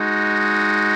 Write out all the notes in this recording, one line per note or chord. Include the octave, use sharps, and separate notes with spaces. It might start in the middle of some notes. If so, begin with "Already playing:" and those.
Already playing: G#3 D#4 F#4